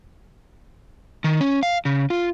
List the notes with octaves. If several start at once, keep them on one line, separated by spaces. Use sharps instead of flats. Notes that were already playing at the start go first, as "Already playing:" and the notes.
D#3
C#4
F5
C#3
F4